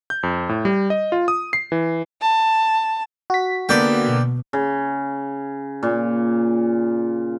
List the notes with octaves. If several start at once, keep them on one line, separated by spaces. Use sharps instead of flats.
G6
F2
A2
G3
D#5
F4
D#6
C7
E3
A5
F#4 B6
D3 A#3 B3 D5 G5
B2
C#3
A#2